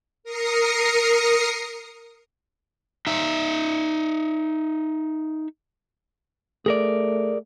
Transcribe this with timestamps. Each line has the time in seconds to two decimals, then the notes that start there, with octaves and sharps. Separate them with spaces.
0.24 A#4 D#6 A#6 C7 C#7
3.07 D#4 E5
6.66 A3 G#4 A#4 D5